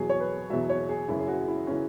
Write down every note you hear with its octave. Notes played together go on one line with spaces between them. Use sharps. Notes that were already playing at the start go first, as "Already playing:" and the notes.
Already playing: E2 B2 F#3 G#4
C#5
B4
E2 B2 F#3 E5
C#5
G#4
F#1 F#2 C#3 E3 E4
G#4
F#4
E4
C#3 E3 C#4